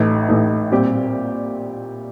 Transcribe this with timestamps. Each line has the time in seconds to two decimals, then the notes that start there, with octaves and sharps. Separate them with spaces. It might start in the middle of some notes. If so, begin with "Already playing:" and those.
Already playing: A1 A2 A3 D#4
0.28 A1 A2 A3 D#4
0.71 A#2 G3 C4 G4